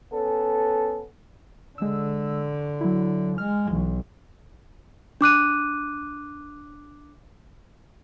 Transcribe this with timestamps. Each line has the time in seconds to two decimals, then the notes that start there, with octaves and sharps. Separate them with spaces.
0.12 B3 C#4 A4
1.78 D3 G#3 E6
2.81 F#3 E4
3.38 G#3 F6
3.72 B1 E3
5.21 D4 D6 F#6 D#7